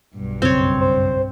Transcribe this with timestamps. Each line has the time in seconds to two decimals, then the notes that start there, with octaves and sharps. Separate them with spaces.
0.13 B1 G2
0.42 F#2 C#3 C4 C#5
0.81 C5